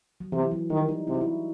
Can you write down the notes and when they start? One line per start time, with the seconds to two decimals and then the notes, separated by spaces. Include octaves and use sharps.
0.20 F#3
0.32 C3 E3
0.51 F#3
0.70 D#3 G3
0.89 D#4
1.07 C3 E4
1.14 F#4
1.21 E4